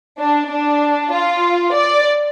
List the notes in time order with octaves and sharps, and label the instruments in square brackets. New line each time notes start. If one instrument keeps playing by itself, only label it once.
[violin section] D4
D4
F4
D5